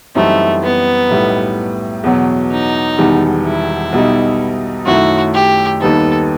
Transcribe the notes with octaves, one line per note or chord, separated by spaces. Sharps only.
F#2 E3 G3 A3 C4 D#4
B3
B1 A2 G3 D#4
E2 B2 F#3
D#4
E1 E2 D#3 G3
E4
B1 B2 G3 D#4
F#2 D#3 F#3 A3 E4 F#4
G4
D#2 D#3 G3 B3 D#4 A4